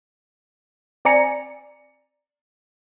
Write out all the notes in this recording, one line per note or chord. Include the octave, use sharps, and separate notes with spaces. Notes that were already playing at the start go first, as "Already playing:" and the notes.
C4 D5 G#5 A#5 C#7